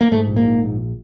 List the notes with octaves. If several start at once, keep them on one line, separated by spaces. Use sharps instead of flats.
A#3
G#2 A3
A#1
A#3
G#2
A#1